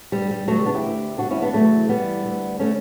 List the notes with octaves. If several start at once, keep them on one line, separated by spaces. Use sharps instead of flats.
G2 D3 G3
G3
D2 C#3 E3 F#3 A3
G3
B3 D4
E4 G4
D2 D3
G2 D3 D4 F#4
C#4 E4
B3 D4
E2 C#3 E3 F#3 A3
G2 E3 G3 B3
D2 D3
D3 A3 C#4